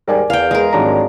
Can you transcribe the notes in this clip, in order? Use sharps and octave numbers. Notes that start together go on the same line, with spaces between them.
D#2 G#2 G3 A#4 D5 G#5
E2 F5 G5
G#3 A#4
G#1 F#3 G3 D4 A#5